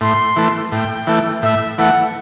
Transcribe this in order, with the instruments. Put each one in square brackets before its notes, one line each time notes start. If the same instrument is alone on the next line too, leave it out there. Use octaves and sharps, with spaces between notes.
[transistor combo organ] A2 [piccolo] C6
[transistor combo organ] E3 A3
[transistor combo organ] A2 [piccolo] G5
[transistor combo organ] E3 A3
[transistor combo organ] A2 [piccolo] E5
[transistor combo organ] E3 A3 [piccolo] F#5